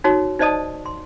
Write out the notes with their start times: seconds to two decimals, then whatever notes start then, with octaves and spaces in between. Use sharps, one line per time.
0.04 D#4 F#4 C#5
0.39 D#4 C5 D5 D#5 A5 D#6
0.86 C6